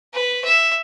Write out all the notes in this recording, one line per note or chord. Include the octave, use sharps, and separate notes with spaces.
B4
E5